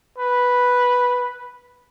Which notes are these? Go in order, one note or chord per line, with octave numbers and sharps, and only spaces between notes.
B4